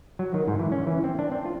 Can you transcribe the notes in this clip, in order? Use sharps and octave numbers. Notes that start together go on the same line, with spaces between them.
F#3
D#3
G#2
E3
C#4
E3
C4
D4
C4
F4